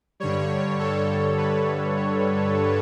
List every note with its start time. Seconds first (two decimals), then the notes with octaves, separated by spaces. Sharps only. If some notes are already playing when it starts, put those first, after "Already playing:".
0.20 G2 D3 G3 C#5
0.79 A4
1.37 B4
1.95 C#5